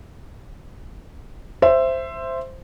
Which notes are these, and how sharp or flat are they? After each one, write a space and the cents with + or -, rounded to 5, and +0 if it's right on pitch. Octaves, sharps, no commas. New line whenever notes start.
C5 +0 E5 +15